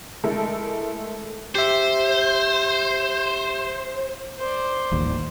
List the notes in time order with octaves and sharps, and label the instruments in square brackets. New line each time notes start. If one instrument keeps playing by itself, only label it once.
[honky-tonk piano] G#3 A3 E4 A4 A#4
[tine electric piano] G4 E5 [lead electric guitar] C5
[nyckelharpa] C5 D5
[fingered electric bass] D#1 A1 D#2